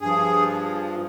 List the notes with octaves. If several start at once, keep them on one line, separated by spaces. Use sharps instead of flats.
G2 F3 G#4